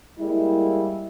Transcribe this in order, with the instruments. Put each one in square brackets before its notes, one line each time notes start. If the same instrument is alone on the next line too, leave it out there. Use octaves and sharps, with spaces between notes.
[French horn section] G3 G#3 A#3 E4